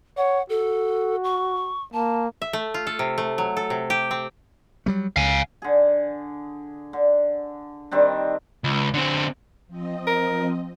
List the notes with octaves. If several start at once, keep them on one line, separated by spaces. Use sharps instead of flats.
C#5 F#5
F#4 A4
C#6
A#3 A5
E5
A3
F4
A4
C3
A3
F#3
A4
C3
G4
C4
F#3 G3 A3
C#2 F5 G#5
D3 G#4
D3
D#3 G3 C4 D4
C#2
D3 C4
F3 C4 D#5
A#4